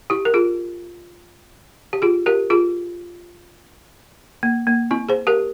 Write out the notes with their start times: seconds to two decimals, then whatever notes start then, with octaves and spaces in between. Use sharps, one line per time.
0.10 E4 G4
0.25 A#4
0.34 F4 G#4
1.93 G4
2.02 F4 G#4
2.26 G4 A#4
2.50 F4 G#4
4.43 A#3
4.67 A#3
4.91 C4 E4
5.09 G#4 C5
5.27 G4 A#4